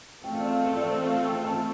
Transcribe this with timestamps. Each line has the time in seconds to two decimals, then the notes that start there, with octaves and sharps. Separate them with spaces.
0.24 A3 C4 F4 A4 G5
0.32 F5
0.40 D5
0.48 F5
0.64 C5
0.77 D5
0.89 C5
1.04 F5
1.25 G5
1.45 A5